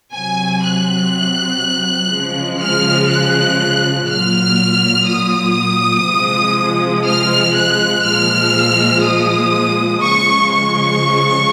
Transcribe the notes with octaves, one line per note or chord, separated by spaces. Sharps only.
C3 F#3 G#5
F#6
C#3 F3 G#3
F6
F#6
A#2 F#3 F6
D#6
C3 F3 G#3
F6
F#6
A#2 F3 G#3 F6
D#6
C#3 F3 G#3 C#6
C#6